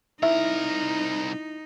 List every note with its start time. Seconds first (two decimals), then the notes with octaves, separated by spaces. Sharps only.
0.23 C2 D#4 E4 A#4 E5